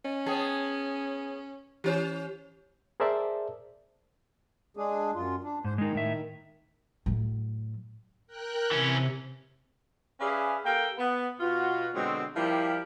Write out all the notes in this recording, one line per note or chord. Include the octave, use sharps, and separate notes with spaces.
C#4 D#5
B3 G#4 C#5 G5 A5
E3 C#4 G4 C5 C#5
G#4 A#4 C5 D5 E5 A5
G#3 D4 G#4
F#2 F4
D4
G#2 C5
D#3 G#3 D#4
A2 E5
A2 F#3
A#4 G5 F#6
C3 E3 C#4
C#4 G#4 B4 D5 E5 F5
A#3 G4 A4 G5
B3
B2 F4 F#4
B2 D3 F#3 G#3 C4
F3 G3 A#3 E4 G4